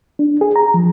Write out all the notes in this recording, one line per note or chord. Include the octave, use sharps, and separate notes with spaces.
D4
G#4
A#5
F3